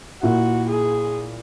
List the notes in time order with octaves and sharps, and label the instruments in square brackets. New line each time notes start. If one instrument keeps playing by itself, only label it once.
[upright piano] A#2 A#3 E4 [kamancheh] F#4
[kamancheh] G#4